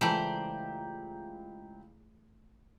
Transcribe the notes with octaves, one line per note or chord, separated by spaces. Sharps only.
C#2 E3 A3 E4 G4 C5 D5 A#5